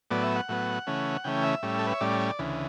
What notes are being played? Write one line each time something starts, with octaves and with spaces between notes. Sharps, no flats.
A2 F#3 B3 D5
E5
F#5
A2 F#3 B3
C#3 E3 A3 C#4
C#3 E3 A3 C#4 G5
E5
A2 G3 C#4
A4
B4
C#5
A2 G3 C#4 D5
D2 C#3 E3